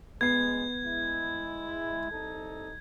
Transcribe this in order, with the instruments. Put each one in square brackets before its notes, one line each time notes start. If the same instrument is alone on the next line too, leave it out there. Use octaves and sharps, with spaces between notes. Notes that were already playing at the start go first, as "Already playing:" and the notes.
[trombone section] A1 D2 G#3 [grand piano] B3 C7 [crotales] G#6
[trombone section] G#3 E4
C2 D#4 A4